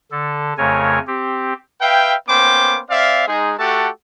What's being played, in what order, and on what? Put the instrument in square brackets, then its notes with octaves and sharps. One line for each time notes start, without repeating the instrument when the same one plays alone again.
[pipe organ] D3 A4
F2 C#3 A3 A#4 C#5 G#5
C4 G4
[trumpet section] B4 E5 F5 G5
A#3 B3 C#4 C5 G5 D6
C4 D5 E5 F5
G#3 D#4 G#4
A3 F#4 G4 A4 F#5 A5